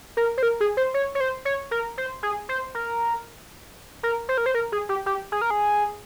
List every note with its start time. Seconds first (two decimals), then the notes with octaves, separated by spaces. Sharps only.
0.17 A#4
0.38 C5
0.43 A#4
0.60 G#4
0.77 C5
0.94 C#5
1.15 C#5
1.20 C5
1.45 C#5
1.71 A#4
1.98 C5
2.23 G#4
2.49 C5
2.75 A#4
4.03 A#4
4.29 C5
4.38 A#4
4.46 C5
4.55 A#4
4.72 G#4
4.89 G4
5.06 G4
5.32 G#4
5.41 A#4
5.50 G#4